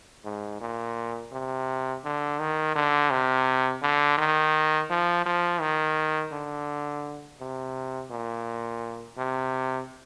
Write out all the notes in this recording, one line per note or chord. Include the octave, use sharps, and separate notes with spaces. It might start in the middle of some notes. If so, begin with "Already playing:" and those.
G#2
A#2
C3
D3
D#3
D3
C3
D3
D#3
F3
F3
D#3
D3
C3
A#2
C3